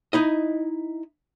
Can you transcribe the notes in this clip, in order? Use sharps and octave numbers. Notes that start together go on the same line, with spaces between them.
D#4 E4 D#5